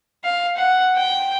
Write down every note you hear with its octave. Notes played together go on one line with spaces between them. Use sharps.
F5
F#5
G5